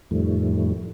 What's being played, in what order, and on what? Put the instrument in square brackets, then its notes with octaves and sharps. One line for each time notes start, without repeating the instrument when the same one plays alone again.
[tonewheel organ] F2 A2 D#3 F3 G3 A3